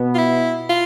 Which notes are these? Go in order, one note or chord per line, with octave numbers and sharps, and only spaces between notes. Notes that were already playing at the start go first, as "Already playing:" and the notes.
Already playing: B2 B3
F4
E4
F4